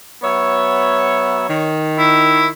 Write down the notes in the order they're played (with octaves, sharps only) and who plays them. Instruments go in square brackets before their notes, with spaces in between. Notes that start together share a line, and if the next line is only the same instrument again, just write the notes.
[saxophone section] F#3 B3 E5 [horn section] C#5
[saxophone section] D#3
[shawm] E4